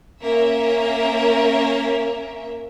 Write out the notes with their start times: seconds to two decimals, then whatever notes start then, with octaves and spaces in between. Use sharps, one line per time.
0.23 A#3 C#4 A#4 E5